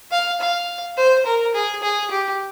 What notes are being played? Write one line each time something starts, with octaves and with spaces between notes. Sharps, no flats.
F5
F5
C5
A#4
G#4
G#4
G4